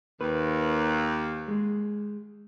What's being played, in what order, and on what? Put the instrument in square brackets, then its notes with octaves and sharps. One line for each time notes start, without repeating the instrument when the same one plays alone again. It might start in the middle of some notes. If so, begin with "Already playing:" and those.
[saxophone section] D#2 [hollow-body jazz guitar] B4
[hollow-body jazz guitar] G#3